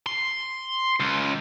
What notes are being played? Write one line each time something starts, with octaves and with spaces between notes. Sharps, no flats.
C6
C#2